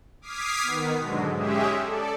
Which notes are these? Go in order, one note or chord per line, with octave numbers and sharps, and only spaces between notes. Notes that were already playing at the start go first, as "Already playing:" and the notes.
D6 D#6 F6 G#6 B6 C7
D#3 B3
G#2 B2 D3 F#3 G#3
G#3 C#4 G4 G#4 E5
A4 D5